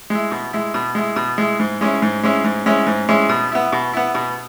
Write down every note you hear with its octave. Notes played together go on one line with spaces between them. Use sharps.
G#3 E4
B2
G#3 E4
B2
G#3 E4
B2
G#3 E4
G#2
G#3 C#4 E4
G#2
G#3 C#4 E4
G#2
G#3 C#4 E4
G#2
G#3 C#4 E4
B2
B3 E4
B2
B3 E4
B2